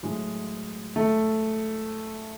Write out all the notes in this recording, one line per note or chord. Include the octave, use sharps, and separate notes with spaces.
A2 F#3 G#3
A3